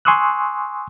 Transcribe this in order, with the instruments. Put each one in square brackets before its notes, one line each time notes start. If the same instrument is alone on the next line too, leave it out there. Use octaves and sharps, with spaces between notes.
[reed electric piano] G#5 C6 C#6 D#6 E6 F#6